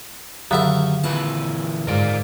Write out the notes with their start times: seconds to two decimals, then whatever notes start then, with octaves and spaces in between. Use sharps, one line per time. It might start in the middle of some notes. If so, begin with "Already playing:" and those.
0.51 F#2 D3 D#3 E5 A5
1.04 A#2 E3 B4 A5
1.87 G#2 A#4 D5 F5